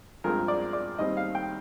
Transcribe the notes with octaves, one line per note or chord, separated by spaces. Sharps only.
G2 F3 G#3 C4 A#4
D5
D5
D#2 D#3 G3 C4 D#5
F5
G5